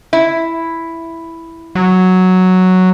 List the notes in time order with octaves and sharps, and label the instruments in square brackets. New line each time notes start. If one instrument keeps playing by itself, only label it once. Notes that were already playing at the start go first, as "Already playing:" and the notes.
[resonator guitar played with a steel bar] E4
[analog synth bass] F#3